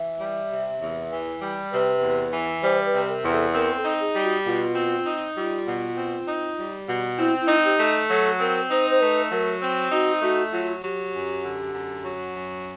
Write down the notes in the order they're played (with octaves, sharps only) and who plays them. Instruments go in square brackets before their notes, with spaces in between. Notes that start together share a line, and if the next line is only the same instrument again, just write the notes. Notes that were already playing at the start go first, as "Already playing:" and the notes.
Already playing: [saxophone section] E3 [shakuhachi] E5
[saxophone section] G3
C3
E2
E3
G3
[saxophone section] C3 [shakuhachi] B4
[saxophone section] E2
E3
[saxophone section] G3 [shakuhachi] C5
[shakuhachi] B4
[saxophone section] C3
[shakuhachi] A#4
[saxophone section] E2
[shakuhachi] A4
[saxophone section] C4 [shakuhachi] A#4
[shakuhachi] A4
[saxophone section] D#4
[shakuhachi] G#4
[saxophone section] G3
[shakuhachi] F#4
[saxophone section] B2 [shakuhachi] F4
[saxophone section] C4
D#4
[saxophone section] G3 [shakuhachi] F4
[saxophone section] B2
C4
D#4
G3
B2
[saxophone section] C4 [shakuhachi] E4
[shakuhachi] E4
[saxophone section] D#4
[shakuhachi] G4
[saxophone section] A3
[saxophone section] F#3 [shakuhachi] A4
[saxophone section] C4 [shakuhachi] A#4
[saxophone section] D#4 [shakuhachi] C5
[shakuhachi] C5
[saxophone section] A3 [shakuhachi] B4
[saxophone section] F#3 [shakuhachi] A#4
[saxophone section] C4
[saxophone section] D#4 [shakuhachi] F#4
[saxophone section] A3 [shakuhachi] F#4
[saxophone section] F#3 [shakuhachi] F4
[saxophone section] F#3 [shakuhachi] G4
[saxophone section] F#2
D3
F#2
F#3
F#2